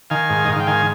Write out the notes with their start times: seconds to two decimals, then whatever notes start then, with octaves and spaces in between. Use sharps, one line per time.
0.10 D#3 F5 G#5
0.30 G#2
0.45 D#5
0.49 G#2 F5
0.60 G5
0.67 D#3 F5 G#5